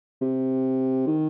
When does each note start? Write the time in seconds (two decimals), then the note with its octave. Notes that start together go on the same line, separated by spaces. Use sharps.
0.21 C3
1.07 D#3